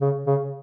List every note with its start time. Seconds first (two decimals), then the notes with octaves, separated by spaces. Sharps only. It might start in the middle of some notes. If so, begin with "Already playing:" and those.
0.02 C#3
0.27 C#3